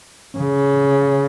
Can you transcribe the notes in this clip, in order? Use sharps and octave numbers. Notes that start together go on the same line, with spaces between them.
C#3